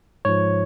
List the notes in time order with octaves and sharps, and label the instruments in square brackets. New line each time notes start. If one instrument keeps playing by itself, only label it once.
[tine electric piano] G#2 F3 C#5